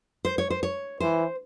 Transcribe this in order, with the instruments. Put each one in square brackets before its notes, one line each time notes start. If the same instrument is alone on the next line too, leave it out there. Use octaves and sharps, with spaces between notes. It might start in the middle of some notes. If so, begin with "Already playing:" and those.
[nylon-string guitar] C5
C#5
C5
C#5
[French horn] E3 [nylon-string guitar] C5